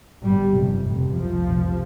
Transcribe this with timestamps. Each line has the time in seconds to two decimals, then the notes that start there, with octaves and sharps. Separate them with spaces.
0.23 G1 G2 G3
0.54 G1 F2 C3
0.85 F1 F2 C3
1.15 C2 C3 F3
1.47 F1 F2 C3